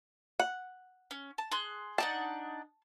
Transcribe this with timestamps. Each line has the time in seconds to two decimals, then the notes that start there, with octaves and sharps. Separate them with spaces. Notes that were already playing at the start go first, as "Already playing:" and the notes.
0.40 F#5
1.11 C#4
1.38 A5
1.52 G#4 C6 F#6
1.98 D4 D#4 F#5 A5